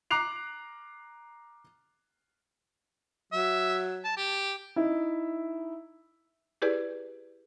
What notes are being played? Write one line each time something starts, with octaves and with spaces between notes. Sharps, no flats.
A#5 D6 F#6 C7 F7
F#3 E5
A5
G4
D#4 E4 E5
E4 G4 G#4 B4 D5